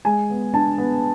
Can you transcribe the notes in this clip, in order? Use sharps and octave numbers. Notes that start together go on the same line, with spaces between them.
G#3 G#5
B3
D4 A5
B3